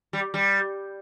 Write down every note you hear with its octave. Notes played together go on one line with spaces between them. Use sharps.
G3
G3